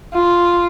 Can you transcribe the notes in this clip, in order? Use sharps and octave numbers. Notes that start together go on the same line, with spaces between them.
F4